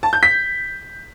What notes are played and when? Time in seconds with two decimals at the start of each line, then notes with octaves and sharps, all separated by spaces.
0.03 A5
0.13 G6
0.23 B6